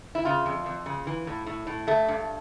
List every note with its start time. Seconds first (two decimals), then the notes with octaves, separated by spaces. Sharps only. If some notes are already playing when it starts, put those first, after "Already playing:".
0.15 E4
0.25 C#3 F4
0.46 F2
0.66 F2
0.86 C#3
1.07 E3
1.27 A2
1.46 A2
1.67 A2
1.87 G2 A3
2.08 G2